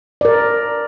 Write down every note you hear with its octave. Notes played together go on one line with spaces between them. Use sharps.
A#4 D5